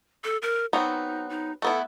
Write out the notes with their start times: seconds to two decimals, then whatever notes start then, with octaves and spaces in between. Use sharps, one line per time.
0.24 A4
0.42 A#4
0.73 F#3 B3 C4 D#4
1.30 D#4
1.62 A3 B3 E4 A4